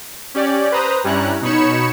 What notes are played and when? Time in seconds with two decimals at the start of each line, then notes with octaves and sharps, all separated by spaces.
0.34 C#4 G4 D5
0.72 B4 C5 A#5 D#6
1.04 G2 G3 C#4 E4 A#5 F#6
1.42 B2 D#4 C#5 B5 C#7 E7